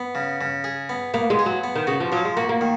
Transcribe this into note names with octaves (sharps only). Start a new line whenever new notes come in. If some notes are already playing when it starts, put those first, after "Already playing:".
Already playing: B3
C#3
C#3
G#4
B3
A#3 B3
G#3
G#4
F#3
B3
D#3
C#3 F#4
F3
F3 F#3
G#3
A#3 F#4
A#3
D#3